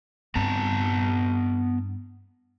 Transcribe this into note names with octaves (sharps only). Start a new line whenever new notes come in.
G2 B3 C4 A5 A#5